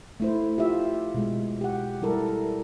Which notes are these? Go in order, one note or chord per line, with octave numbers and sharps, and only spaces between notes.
A3 E4 C5
F4 G4 E5
B2 G#3
G4 F#5
G3 E4 A4 A#4